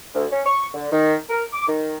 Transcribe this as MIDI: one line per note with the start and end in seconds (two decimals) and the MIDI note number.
0.15 0.25 38
0.31 0.41 61
0.46 0.65 85
0.74 0.87 50
0.92 1.15 51
1.29 1.44 70
1.53 1.68 86
1.68 1.98 51